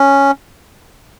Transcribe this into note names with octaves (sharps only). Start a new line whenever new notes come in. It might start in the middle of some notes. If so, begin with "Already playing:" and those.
Already playing: C#4